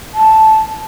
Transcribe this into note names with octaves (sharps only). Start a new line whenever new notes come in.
A5